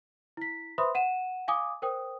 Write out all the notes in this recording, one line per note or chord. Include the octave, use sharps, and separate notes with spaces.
E4 B6
B4 C5 E5 B5 C6 D#6
F#5 D#7 E7
F5 G#5 D6 D#6
A#4 C5 G5 D#6